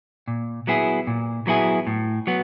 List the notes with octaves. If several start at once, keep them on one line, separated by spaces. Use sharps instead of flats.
A#2
F#3 B3 E4 G#4
A#2
F#3 B3 E4 G#4
A2
F#3 B3